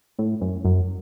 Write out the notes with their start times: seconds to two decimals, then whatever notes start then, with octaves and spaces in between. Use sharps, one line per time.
0.19 A2
0.41 F#2
0.65 F#2